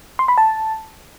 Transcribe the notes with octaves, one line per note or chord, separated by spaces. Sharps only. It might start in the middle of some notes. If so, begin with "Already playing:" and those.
C6
B5
A5